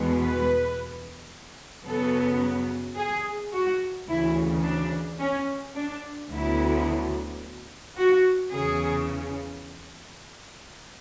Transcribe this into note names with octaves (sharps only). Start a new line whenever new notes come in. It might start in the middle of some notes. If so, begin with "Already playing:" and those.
Already playing: E2 B2 G#3 B3
B4
F#2 C#3 F#3 B3 A4
G#4
F#4
D2 C#3 E3 E4
D4
C#4
D4
D2 D3 F#3 B3 E4
F#4
E2 C#3 G#4